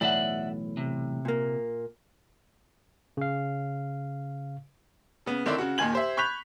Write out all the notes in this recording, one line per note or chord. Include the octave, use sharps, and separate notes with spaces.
B1 E2 A2 D5 E5 F#5
C3
A#2 A#3
C#3 F5
C#3 B3
D3 D#3 C4 D4 E4 D5
C#3 F#4
D#2 A#2 D#3 G#5 G#6 F#7
G4 C5 E5
B5 C#6 F#6 G6 B6 F7